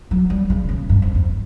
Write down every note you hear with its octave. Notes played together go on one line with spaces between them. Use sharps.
F#3
G3
C#3
C#3
G2
F2
F2